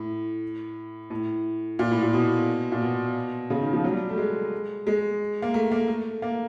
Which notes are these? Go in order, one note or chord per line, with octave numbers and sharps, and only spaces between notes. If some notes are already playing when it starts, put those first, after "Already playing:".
Already playing: A2
A2
A#2
A2
A#2
B2
A#2
B2
C#3
D#3
F3
F#3
G3
A3
G#3
G#3
A#3
A3
A#3
A3
A#3